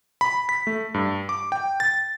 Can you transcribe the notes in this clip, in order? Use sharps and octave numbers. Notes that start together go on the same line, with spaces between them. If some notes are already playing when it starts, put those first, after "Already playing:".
B5
B6
A3
G2
D6
G5
A6